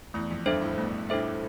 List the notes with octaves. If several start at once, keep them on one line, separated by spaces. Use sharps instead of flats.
E2 A3
F2
G2 D4 A4 C5 E5
A2
B2 A3
A2 D4 A4 C5 E5